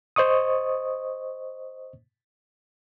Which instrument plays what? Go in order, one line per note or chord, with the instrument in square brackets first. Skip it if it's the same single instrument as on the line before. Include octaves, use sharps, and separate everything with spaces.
[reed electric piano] C5 D#5 C#6 D#6